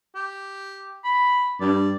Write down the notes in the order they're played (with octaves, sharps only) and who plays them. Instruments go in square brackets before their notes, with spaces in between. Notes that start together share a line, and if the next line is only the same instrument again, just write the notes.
[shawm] G4
B5
[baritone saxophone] G2 [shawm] D5